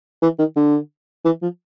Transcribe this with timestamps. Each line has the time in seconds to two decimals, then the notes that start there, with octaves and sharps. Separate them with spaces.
0.22 E3
0.39 D#3
0.56 D3
1.25 E3
1.42 F3